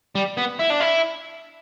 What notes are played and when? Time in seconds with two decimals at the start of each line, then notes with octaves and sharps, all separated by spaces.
0.15 G3
0.37 B3
0.59 E4
0.70 D4
0.80 E4